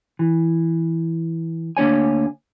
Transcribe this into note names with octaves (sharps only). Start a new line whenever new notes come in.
E3
D2 A#3 D4 C#5 G#5